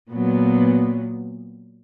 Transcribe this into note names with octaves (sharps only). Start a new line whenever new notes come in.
A#2 F#3 B3